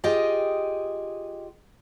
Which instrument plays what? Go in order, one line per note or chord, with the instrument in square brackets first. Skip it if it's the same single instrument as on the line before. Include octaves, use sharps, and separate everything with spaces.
[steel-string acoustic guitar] F4 G4 G#4 D#5 G5